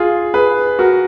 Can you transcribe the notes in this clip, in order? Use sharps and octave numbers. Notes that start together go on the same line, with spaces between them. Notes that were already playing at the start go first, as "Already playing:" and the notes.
Already playing: F4 G#4
G#4 B4
F#4 A#4